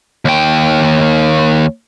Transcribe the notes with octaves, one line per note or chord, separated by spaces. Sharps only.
D#2 G5